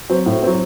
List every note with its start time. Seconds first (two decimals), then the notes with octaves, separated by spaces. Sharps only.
0.09 F#3 C4
0.26 A2
0.42 F#3 C4